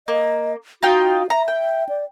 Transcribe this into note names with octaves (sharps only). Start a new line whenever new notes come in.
A#3 D#5
D#4 F4 F#4 G5
E5 A#5
G5
D5